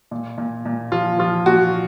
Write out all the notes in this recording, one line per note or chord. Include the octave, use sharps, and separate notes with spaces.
A#2
A#2
A#2
F3 F4
F3 F4
A#2 F#4